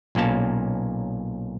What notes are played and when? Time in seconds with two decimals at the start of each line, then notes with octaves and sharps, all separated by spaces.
0.15 B1 A#2 A#3 C#4 A5